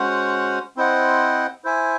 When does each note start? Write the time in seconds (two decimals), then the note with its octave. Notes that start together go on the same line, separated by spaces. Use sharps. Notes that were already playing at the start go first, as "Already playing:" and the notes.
Already playing: G#3 C#4 F#4 C5 F#5
0.76 C4 E4 C5 D#5 F#5
1.64 E4 C5 E5 G#5